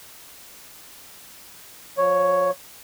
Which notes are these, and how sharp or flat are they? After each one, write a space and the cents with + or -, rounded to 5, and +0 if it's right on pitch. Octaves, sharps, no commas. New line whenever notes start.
F3 +25 C#5 +0